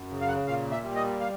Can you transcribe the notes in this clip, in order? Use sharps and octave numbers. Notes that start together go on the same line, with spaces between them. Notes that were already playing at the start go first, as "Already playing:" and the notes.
Already playing: F#2
C#3
F5
F#5
A#2 F5
E5
G3
D#5
F5